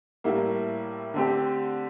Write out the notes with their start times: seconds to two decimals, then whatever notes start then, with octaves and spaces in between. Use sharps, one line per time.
0.24 A2 G3 A#3 E4
1.14 D3 A3 C4 G4